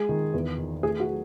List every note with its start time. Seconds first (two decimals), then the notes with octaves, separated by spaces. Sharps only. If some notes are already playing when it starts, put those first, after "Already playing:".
Already playing: G#3 G#4
0.09 D#3
0.34 E2
0.58 D#3
0.83 A3 G#4
1.00 F#4
1.08 F#3